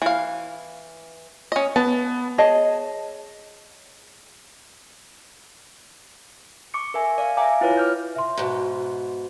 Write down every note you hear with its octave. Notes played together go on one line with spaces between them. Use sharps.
E3 F5
C#4 D#5
B3 A5
G#4 C#5 D#5 A5
C#6 D6 C#7
A#4 E5 G#5
D5 F5
E5 F5 G5 G#5 A#5 D6
E4 F4 B4 C#5
D6 F6 G6
E5 C6
G#2 B2